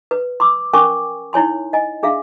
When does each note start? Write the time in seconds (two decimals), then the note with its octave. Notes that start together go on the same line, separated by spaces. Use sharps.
0.11 B4
0.40 C6 D6 E6
0.74 C#4 A#4 G5 G#5 C#6 D6
1.33 D#4 E4 C#5 G#5 C6
1.73 D#5 G#5
2.03 D4 G#4 E5 F5